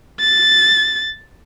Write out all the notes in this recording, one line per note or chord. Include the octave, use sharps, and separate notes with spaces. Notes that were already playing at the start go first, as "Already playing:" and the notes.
A6